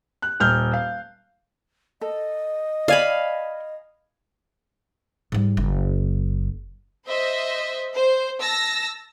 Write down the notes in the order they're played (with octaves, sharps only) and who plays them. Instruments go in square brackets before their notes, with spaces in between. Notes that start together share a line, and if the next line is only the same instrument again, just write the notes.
[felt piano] F#6
D#1 F6 G6
F5
[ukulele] A4 [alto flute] D#5
[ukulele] D5 [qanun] F5 G#5 B5
[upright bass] G#2 G3
F#1
[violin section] C5 D#5 E5
C5
A5 E6 A#6